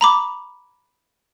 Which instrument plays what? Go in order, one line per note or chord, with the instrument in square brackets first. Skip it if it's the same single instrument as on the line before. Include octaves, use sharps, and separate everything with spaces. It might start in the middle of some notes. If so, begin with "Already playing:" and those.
[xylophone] A#5 B5 D6